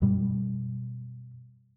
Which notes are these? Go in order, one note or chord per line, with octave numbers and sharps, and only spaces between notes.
F#2 B2 G3